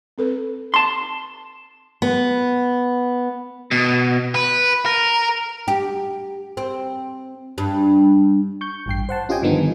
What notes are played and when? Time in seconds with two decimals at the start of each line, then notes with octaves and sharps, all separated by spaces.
0.18 C4 A4 B4
0.74 A5 C6
2.02 B3
3.71 B2
4.35 B4
4.86 A#4
5.68 G4
6.57 C4
7.58 G2
8.61 C#6 G6
8.86 A1 G2 G5 C7
9.09 C5 F#5 A5
9.29 C#4 F4 G4 D#5 G5 G#5
9.42 G2 D3 D#3 F3 B3 D#4